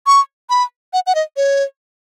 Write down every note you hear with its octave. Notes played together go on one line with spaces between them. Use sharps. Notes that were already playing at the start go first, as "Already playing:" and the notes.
C#6
B5
F#5
F#5
D#5
C#5